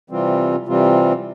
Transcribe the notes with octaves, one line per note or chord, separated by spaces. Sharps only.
C3 E3 G3 C4 F4
C3 E3 G3 C4 F4